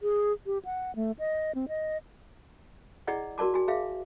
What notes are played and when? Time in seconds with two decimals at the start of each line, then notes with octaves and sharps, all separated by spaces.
0.02 G#4
0.46 G4
0.65 F#5
0.96 A3
1.19 D#5
1.55 C4
1.68 D#5
3.07 E4 G#4 D5 D#5 F#5
3.38 F#4 A#4 D5 A5 D6
3.54 F#4 G#5
3.68 G#4 E5 F5